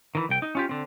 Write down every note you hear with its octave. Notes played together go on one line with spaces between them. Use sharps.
D#3 E3
C2 G5
D#4
C#4 F4 G4
D3 C4